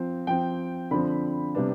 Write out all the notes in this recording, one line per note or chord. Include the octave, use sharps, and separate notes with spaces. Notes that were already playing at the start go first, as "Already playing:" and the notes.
Already playing: F3 C4
F3 C4 G5
D3 F3 C4 B5
C3 G3 B3 D4